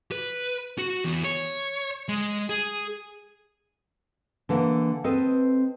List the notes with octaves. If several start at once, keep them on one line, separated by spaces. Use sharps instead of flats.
B4
F#4
E2
C#5
G#3
G#4
D3 E3 A#3
C4 A4 B4 D#5